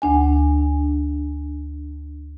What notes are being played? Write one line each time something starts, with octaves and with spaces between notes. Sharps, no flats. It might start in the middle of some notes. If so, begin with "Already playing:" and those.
D2 D4 G#5